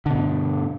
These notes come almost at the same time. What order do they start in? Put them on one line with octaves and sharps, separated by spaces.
D3 B2 G2